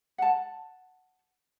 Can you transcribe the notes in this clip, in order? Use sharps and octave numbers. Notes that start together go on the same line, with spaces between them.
F#5 A5